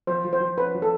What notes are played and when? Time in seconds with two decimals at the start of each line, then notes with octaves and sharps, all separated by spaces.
0.07 F3 C5
0.24 F3
0.33 C5
0.40 F3
0.57 C#4 B4
0.75 F3
0.82 A4